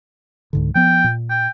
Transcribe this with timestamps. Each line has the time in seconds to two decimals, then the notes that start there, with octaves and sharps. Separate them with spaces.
0.53 C#2 G#2 D3
0.75 F3 B3 G5
1.04 A#2
1.30 G5